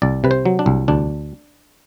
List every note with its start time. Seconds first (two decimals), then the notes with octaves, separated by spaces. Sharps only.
0.02 C2 D5
0.24 C3 B4
0.31 C5
0.46 F#3
0.59 D4
0.66 C2
0.88 D2 D4